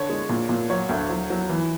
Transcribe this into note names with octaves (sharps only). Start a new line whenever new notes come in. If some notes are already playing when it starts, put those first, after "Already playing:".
Already playing: D3 C#5
G#3
A#2
A#2
F#3 C#5
D2
F#3
F#3
E3